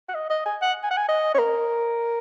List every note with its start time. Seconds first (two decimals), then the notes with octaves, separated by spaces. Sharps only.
0.09 F#5
0.15 D#5
0.30 D#5
0.46 G#5
0.62 F#5
0.83 G#5
0.91 F#5
0.97 G#5
1.08 D#5
1.35 C#5
1.39 A#4